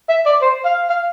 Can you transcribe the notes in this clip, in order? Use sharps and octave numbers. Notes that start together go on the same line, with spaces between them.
E5
D5
C5
F5
F5